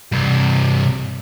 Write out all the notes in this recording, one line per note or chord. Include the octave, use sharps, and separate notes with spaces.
G2 C3